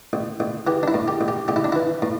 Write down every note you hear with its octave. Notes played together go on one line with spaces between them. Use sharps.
A1
A1
E3 G4
D4
E4
A2
G4
A1
G4
A1 G4
E4
D4
E3 E4
A2